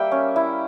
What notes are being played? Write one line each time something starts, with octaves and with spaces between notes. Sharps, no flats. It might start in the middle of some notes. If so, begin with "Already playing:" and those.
Already playing: G3 A#3 E5 G5
C#4
E4